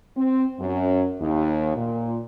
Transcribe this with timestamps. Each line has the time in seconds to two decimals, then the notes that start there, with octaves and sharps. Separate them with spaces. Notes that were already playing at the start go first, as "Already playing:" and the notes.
0.15 C4
0.59 F#2
1.21 D#2
1.75 A#2